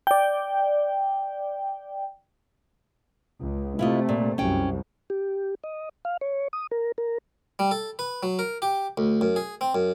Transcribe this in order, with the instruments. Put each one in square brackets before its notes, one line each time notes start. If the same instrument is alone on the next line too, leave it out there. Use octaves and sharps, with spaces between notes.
[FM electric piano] D5 G5
[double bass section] C#2
[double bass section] C3 A3 [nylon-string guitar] E4 F4 D#5
[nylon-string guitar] A#2
[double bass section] C2 F#2 [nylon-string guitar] C#4 G5
[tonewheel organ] G4
D#5
F5
C#5
D#6
A#4
A#4
[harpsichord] G3
A4
B4
F#3
A#4
G4
D2
F#2
G#4
C4
F#2